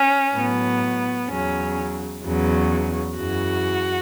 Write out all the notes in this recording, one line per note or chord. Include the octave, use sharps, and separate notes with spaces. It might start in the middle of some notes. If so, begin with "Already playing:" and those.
Already playing: C#4
A2 F#3 B3
E2 C#3 F#3 C#4
E2 C#3 F#3
F#2 C#3 E3 F#4